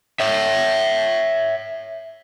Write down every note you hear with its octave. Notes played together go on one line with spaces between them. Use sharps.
C#5 E5